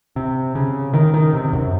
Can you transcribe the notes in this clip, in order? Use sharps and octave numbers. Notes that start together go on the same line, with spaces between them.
C3
C#3
D#3
D#3
C3
F#2